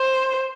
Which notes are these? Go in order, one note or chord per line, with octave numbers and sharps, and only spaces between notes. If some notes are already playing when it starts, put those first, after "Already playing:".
Already playing: C5